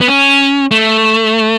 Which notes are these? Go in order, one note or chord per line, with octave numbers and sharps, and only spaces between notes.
B3
C#4
A3